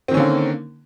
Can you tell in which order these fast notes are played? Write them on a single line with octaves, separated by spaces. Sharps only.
C4 D#3 C#4 D3 A#3